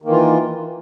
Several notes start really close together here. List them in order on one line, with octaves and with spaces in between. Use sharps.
D#3 A#3 E3 F4